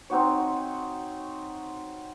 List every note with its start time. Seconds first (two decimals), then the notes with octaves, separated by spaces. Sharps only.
0.10 C4 D#4 F#4 C#5